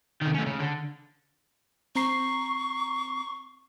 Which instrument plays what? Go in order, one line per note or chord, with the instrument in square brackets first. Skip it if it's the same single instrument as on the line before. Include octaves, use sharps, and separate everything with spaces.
[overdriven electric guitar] C3 D#3
A3 C#4
C#3
D3
[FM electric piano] C4 A#5 C7 [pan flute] C#6